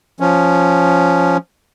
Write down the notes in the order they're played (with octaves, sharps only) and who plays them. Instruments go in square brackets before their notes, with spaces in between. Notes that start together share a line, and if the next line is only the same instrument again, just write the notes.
[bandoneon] F3 C#4